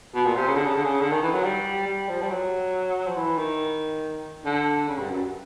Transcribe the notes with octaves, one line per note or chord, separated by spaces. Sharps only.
B2
A#2
C3
C#3
D3
C#3
D3
C#3
D3
D#3
E3
F#3
G3
G3
F3
G3
F#3
F3
E3
D#3
D3
C#3
G2
F#2